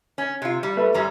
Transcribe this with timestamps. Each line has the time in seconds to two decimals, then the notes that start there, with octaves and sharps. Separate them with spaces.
0.18 C#4
0.42 C3 F4
0.63 G3
0.77 A3 B4 E5
0.94 F#2 G3 C#4 A#5